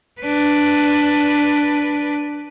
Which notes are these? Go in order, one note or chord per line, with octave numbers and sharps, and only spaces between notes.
D4 B4